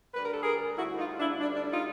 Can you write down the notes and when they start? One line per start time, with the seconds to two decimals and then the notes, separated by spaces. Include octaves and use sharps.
0.13 D2 D3 G3 B4
0.22 A#4
0.31 A4
0.41 G#4 A#4
0.76 D2 D3 G3 E4 F#4
0.97 D#4 F4
1.18 D4 E4
1.39 D2 D3 G3 D4
1.54 D4
1.71 D#4 F4